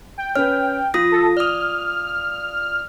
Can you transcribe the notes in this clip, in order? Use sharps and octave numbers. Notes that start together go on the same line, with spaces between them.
G5
C#4 B4 F6
F3 F4 D#6 A#6
A4
D5 D#6 F6